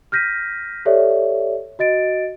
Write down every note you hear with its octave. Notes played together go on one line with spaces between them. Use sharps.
F6 G6 A#6 B6 D#7
G4 A4 C#5 D5 E5
F#4 D#5 A6 D7